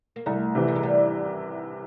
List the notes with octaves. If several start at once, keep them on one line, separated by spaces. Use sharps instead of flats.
A#3
C2 A3
C3 E3
A3
G#3
G3